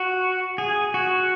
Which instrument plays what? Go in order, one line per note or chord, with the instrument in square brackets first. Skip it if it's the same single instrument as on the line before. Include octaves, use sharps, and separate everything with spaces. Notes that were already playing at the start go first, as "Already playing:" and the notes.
Already playing: [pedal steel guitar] F#4
G#4
F#4